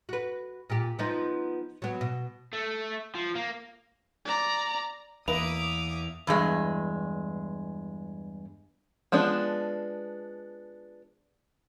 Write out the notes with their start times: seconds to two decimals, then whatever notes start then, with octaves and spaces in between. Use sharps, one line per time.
0.09 F#4 B4
0.70 A#2 G4
0.99 F3 B3 D#4
1.82 F#3 B3
2.01 B2
2.53 A3
3.15 F3
3.35 A#3
4.25 D5 A#5
5.28 E2 A#3 B4 D#5 E5 D6 D#6 F7
6.27 E2 G2 G#3
9.12 F3 G#3 B3 D4